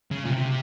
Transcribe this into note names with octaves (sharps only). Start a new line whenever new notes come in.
C#3
A#2
C3